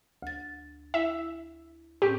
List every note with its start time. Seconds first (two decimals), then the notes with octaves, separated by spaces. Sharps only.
0.22 D2 A6
0.94 E4 E5
2.02 A2 C4 C#4 G4